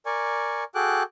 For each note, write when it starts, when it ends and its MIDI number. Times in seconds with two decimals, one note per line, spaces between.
0.06 0.64 70
0.06 0.64 74
0.06 0.64 80
0.06 0.64 85
0.75 1.03 66
0.75 1.03 68
0.75 1.03 69
0.75 1.03 79
0.75 1.03 86
0.75 1.03 90